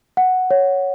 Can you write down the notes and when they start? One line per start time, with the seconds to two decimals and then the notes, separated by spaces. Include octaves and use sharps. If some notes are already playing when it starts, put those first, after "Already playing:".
0.17 F#5
0.51 C#5